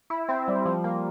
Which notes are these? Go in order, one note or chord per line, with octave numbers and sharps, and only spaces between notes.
E4
C4
G3
F3
A#3